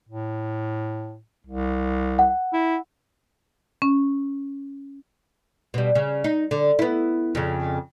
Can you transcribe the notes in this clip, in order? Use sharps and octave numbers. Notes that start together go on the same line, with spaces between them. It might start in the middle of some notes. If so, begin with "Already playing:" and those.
A2
C2
F#5
E4
C#4
B2 G3
C#3
D#4
D3
B3 E4
F2 C#3